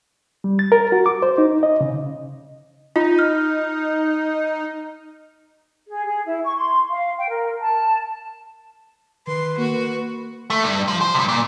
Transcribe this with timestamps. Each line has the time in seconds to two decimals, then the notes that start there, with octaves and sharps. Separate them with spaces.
0.44 G3
0.59 A6
0.72 A#4
0.92 F#4
1.06 D6
1.22 C5
1.38 D#4
1.63 D#5
1.81 C#3
2.96 D#4 F4
3.19 F6
5.88 G#4
6.06 G#4
6.26 E4
6.44 C#6
6.56 C6
6.90 F5
7.17 G5
7.29 A#4
7.61 A5
9.27 D#3 B4 C6
9.58 A#3 F#4
10.50 A3
10.64 G2
10.88 F3
11.01 C5
11.14 G2 C3
11.28 A#2